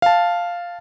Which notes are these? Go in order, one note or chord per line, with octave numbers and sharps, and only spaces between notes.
F5 A5